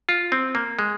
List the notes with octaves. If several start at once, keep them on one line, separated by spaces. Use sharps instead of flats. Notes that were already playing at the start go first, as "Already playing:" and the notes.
F4
C4
A#3
G#3